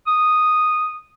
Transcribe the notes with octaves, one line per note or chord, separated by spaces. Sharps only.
D#6